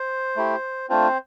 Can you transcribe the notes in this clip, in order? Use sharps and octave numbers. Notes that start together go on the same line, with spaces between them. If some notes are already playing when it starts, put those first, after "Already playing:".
Already playing: C5
A3 E4 G4
A3 C4 D4 F4 C5